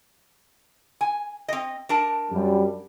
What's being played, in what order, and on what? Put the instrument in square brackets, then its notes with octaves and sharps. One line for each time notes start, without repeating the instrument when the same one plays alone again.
[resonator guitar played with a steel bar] G#5
C4 D#5
D4 A#4 A5
[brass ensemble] F#2 G3